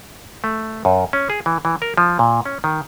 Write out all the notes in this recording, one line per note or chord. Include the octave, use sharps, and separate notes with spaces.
A3
F#2
C#4
G#4
E3
E3
A#4
F3
A#2
C#4
D#3